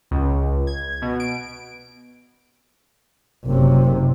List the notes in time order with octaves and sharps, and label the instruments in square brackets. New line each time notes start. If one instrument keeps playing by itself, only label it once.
[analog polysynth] C#2
G#6
B2
D7
[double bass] F#1 C3